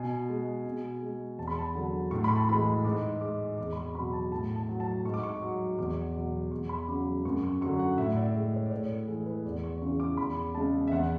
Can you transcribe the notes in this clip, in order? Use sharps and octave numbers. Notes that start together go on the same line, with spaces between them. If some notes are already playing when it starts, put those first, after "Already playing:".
Already playing: B2 G#5
G#3
B2
G#3
E2 A5
B5
A5
D3 F#3
A2 C#6
B5
A5
E3 G#3 B5
G#2 D6
G#3 D6
E2 D6
B5
C#6
B2 F#3 B5
A5
A2 A5
A5
F#3
A5
G#2 C#6
D6
C#6
F#3
E2 D6
B2 F#3
E2 C#6
B5
C#3 F#3 D6
F#2 C#6
C#6
D3 F#3 C#6
F#5
A2 E5
D5
G#3
C#5
D5
A2 C#5
A4
E3 G#3 G#4
B4
E2 D5
C#6
C#3 E3 C#6
D6
E2 B5
C#3 G#3 A5
E5
E2 F#5